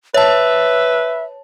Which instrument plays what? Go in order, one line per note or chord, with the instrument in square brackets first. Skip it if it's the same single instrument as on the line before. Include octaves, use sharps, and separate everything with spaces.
[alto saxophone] B4 [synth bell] C#5 A5 [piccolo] E5